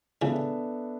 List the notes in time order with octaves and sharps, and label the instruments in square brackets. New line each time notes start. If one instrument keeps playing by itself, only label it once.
[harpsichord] C#3 E3 [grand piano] B3 D4 A4 E5